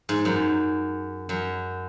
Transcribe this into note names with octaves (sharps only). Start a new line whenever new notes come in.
G#2
F#2
F#2